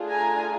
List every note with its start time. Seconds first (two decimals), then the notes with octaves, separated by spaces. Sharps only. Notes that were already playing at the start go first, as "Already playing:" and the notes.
Already playing: A3 D4 F4 G#4
0.09 G#5 A#5